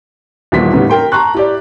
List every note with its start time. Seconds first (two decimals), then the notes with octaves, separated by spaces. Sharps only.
0.52 D#1 D#2 A#2 E3 B3 B6
0.73 A2 C#3 B3 D#4 G4
0.90 A#4 G5 C6
1.12 A5 A#5 C6 C#6 F#6
1.34 E4 G4 D5